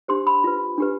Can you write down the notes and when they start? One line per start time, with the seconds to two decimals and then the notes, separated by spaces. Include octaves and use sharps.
0.08 D4 G4 C5 C6
0.27 B5
0.44 F4 B4
0.78 D4 G4 B4